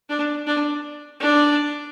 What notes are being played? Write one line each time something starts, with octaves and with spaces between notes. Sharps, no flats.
D4
D4
D4